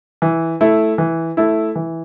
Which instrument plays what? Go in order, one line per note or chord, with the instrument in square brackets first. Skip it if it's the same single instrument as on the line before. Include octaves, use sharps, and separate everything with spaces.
[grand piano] E3
A3 E4
E3
A3 E4
E3